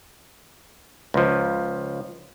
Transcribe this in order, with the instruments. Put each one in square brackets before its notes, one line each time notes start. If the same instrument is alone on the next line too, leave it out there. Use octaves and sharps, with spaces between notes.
[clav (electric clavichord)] C#2 F3